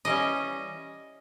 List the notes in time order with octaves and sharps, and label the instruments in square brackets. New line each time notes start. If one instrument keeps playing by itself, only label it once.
[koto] E3 G3 C#4 D#5